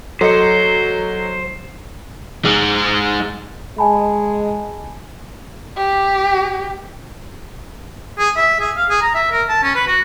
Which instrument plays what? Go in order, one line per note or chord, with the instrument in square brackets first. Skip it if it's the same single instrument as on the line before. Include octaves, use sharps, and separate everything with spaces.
[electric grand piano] F#3 [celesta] A4 D#5 C#7 [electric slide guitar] C5
[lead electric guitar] G#3 D#4
[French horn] G#3 [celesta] G#5 A5 B5
[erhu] G4
[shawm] G#4
E5
G#4
F5
G#4
A#5
E5
A#4
A5
C#4
B4
F#4